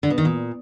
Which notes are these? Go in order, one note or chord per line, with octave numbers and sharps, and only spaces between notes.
D3
B2
D#3
A#2